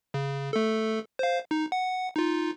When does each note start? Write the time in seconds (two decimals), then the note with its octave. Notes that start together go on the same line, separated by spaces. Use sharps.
0.14 C#3
0.53 A3 A4
1.19 C5 F5
1.51 D#4
1.72 F#5
2.16 D#4 F4